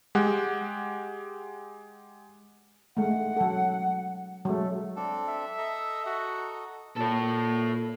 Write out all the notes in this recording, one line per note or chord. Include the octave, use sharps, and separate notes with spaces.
G#3 G4 F#5
G#3 A3 F#5
F#3 A4
F#3 G#3 A3
C4 D4 A4
E5
A4 D#5 A#5
F#4
A#2 A4 C#5